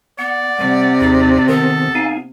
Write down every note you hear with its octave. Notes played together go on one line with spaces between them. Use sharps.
B3 D5 F#5
C3 G3
D#2 D#4 G#4
D#3 B3 A4
D#4 F5 G#5